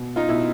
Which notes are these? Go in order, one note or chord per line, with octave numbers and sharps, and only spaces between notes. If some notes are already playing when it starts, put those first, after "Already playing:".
Already playing: B2
D#4 F4
B2 E4